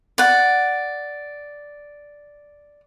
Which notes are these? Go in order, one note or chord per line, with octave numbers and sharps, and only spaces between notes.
D5 F#5